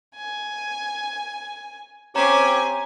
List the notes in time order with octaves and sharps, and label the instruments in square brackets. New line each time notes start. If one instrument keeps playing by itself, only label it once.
[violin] G#5
[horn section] C4 C#4 [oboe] G4 [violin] G#5 [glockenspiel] A#5